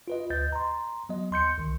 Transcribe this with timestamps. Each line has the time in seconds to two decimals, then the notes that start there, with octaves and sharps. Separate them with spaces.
0.08 F4 B4 D#5
0.30 D2 B4 D#5 G6 A6
0.52 A#5 C6
1.09 F#3 B3 D#5
1.31 D#2 C6 G6 C#7
1.58 C2 D#3